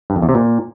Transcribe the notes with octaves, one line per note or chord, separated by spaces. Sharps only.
G2
F2
E2
C3
A#2